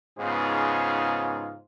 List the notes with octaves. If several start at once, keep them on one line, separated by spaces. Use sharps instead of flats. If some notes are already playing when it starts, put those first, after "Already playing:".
G#2 C#3 B3 D#4 F4 G#4